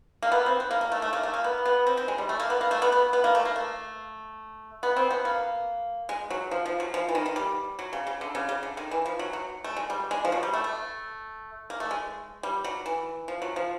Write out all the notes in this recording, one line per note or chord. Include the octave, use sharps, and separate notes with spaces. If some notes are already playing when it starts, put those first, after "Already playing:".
A#3
B3
C4
B3
A#3
A#3
A3
A3
A#3
A3
A#3
B3
B3
C4
C4
G#3
G3
A3
A#3
B3
A#3
A3
B3
B3
B3
A#3
A3
A#3
A3
B3
C4
B3
A#3
G#3
F#3
F3
F3
F#3
F3
E3
D#3
D#3
G3
F#3
C#3
C#3
D3
C#3
C#3
D3
D#3
E3
F3
F#3
F#3
A3
G#3
G3
G#3
F3
F#3
G3
A3
A3
A#3
A3
G#3
G3
F#3
E3
F3
F#3
F3